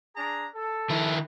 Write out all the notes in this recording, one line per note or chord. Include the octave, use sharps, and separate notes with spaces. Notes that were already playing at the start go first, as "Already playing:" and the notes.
D4 G#4 A#5
A4
D#3 E4